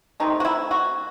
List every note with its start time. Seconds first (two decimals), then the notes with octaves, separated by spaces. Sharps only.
0.20 C3 D#3 A3 D#4
0.40 F#4
0.45 E4
0.71 F#4